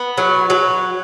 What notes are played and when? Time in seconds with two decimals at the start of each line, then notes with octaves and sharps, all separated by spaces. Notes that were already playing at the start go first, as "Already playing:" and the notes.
Already playing: B3
0.18 F#3
0.50 F#3